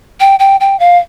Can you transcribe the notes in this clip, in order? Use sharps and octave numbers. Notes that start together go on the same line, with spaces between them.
G5
G5
G5
F5